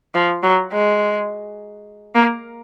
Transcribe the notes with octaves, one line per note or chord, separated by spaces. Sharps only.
F3
F#3
G#3
A#3